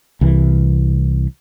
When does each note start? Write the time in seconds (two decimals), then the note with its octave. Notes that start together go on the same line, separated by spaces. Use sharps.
0.21 C2 E3